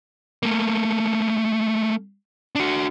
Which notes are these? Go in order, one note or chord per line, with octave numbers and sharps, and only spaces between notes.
A3 A#3
D4 F#4